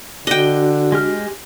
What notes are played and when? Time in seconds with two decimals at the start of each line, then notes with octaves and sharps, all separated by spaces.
0.27 D3 D4 F#4 D#5 G5
0.92 G#3 G4 F6